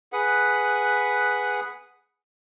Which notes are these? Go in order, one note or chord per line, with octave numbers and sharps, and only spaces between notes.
G#4 B4 F#5